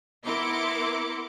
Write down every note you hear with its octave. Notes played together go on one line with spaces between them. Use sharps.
B3 E4 A#4 C6 D6 C#7